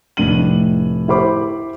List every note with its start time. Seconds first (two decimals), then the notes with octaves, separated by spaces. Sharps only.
0.17 F1 A2 D4 D#7 F#7
1.08 E4 G4 C5 B5 D6